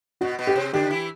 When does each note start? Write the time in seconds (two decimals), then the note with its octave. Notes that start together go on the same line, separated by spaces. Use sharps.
0.21 B2 B3 F#4
0.39 B2 B3
0.47 G4
0.56 C3 C4
0.73 D3 D4 G4
0.90 E3 E4